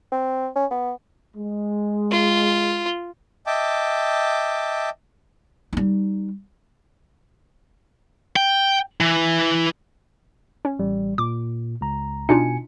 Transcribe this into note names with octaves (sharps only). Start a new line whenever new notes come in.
C4
C#4
B3
G#3
F4
D#5 E5 G5 A5 D6
G3 D#4
G5
E3
C#4
A1 G3
A#2 D6
C#2 A#5
B2 D4 D#4 F4 G#5 C#7